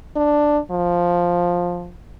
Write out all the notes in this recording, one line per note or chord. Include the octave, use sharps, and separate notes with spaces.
D4
F3